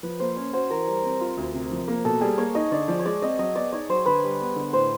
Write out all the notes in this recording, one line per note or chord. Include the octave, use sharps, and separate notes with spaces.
F3 B4
A#3 C5
C#4 C#5
F#4 C5
E3 A#4
G3
C4
F4
D2
C3
F3
A#3
B2 A4
G3 G#4
A#3 C#5
D#4 D#5
D3 D5
F3 D5
C#5
G#3 D5
C4 D#5
F#3 D#5
B3 D5
D#4 C#5
F#3 C5
D3 B4
G3
B3
D3
A2 C5